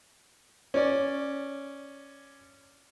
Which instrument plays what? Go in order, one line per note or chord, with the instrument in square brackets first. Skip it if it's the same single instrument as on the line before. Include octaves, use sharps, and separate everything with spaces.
[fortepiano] C#4 D5